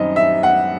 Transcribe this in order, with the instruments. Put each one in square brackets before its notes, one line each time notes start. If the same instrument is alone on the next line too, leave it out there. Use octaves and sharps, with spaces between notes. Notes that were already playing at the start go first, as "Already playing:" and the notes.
Already playing: [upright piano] F#2 D#3 G3 C4 D#5
E5
F#5